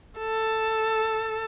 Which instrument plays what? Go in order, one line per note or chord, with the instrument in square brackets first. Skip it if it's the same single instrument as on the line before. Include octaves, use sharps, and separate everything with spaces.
[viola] A4